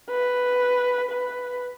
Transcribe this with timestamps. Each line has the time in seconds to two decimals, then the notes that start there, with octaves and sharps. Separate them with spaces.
0.10 B4
1.11 B4